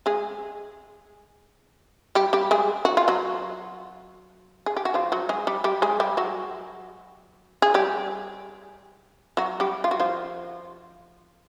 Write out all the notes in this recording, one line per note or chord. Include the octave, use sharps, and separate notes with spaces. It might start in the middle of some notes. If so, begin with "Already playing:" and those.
G#3 G#4
G3 G4
G3 G4
G#3 G#4
F#4
F4
F#3 F#4
G#4
G4
F#4
F3 F4
F#3 F#4
G#3 G#4
G3 G4
G3 G4
G#3 G#4
G3 G4
F#3 F#4
G#4
G3 G4
F#3 F#4
G3 G4
F4
F#4
F3 F4